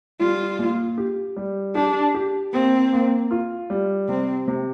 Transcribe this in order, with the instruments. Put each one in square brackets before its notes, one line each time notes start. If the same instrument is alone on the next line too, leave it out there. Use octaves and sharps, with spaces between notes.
[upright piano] G3 [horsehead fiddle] F4
[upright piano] A#2
G4
G3
[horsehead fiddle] D4 [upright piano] G4
[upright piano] G4
[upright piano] A#3 [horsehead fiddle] C4
[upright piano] A#3
F4
G3
[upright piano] C3 [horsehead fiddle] C4
[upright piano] C3